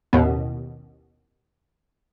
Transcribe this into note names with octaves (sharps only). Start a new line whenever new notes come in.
A1 D#2 B2